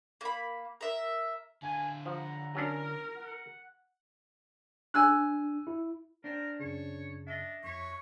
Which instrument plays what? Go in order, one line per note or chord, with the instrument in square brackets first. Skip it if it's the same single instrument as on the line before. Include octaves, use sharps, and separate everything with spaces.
[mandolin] A#3 B5
A#4 E5
[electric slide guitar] D3 F5 A5 [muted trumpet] G#5
[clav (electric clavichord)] F3 [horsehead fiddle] F#5 [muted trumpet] A#5
[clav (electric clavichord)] F#3 C#4 D4 [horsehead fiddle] A#4
[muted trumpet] F#5
[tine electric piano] D4 [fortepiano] G#5 E6 F#6
[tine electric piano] E4
[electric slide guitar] D4 C5 G5 [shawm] A#4
[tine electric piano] F#2 C#3 [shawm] C#5
[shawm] D4 [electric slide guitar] D#5 E5
[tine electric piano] F2 B6 [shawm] C#5 [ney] C#6